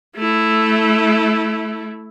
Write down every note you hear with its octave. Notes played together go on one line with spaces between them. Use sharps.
A3 E4